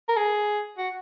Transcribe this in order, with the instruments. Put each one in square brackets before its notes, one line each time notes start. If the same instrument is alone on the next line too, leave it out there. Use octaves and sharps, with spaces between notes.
[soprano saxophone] A#4
G#4
F#4